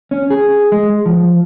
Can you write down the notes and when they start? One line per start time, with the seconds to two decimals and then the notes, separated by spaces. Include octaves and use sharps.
0.11 C#4
0.30 G#4
0.72 G#3
1.06 F3